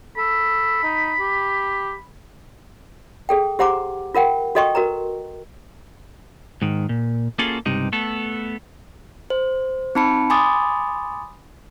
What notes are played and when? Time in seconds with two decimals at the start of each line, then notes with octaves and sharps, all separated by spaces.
0.17 A4 B5
0.83 D#4
1.19 G4
3.29 G#4 A4 G5
3.59 G4 C5 F#5 A#5 C6 D6
4.15 F4 A#4 F#5 G5
4.55 F#4 A4 D#5 G5 C6 C#6
4.75 F#4 A#4 B4 A#5
6.62 G#2 D#3
6.89 A#2
7.39 A#3 C#4 F4 F#4 G#4 A4
7.66 C#2 G2 C3 D#4
7.92 A3 B3 A4
9.30 C5
9.95 C4 D#4 A5 B5 C#7
10.30 G#5 B5 C6 D6 D#6 A6